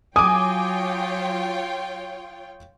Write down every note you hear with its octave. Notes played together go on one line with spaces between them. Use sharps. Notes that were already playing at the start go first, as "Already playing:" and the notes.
F#3 F4 C#5 G5 G#5 D6 D#6